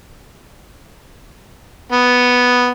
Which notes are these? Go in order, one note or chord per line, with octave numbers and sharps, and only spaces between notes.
B3